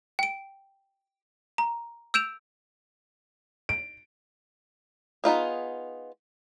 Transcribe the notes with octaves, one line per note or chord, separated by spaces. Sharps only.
G5 D7
A#5
E6 G6 D7 E7 F7
D7
B3 D#4 F4 G#4